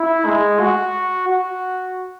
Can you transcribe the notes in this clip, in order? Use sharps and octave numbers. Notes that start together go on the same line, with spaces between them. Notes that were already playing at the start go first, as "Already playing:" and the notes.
Already playing: E4
G#3
F#4
F#4